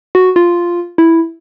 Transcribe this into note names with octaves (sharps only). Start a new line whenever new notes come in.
F#4
F4
E4